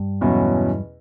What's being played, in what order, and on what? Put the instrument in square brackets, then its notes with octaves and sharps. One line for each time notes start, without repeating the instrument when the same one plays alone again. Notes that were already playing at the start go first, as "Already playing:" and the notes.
Already playing: [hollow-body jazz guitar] G2
[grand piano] E2 B2 F#3 C#4 E4